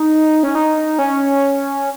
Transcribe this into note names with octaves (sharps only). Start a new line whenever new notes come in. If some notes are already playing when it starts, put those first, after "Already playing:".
Already playing: D#4
C#4
D#4
C#4